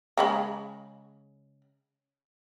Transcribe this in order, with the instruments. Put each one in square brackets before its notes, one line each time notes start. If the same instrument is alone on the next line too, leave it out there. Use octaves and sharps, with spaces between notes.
[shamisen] C#3 G#3 B5